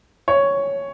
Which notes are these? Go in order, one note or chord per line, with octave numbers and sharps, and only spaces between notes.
C#5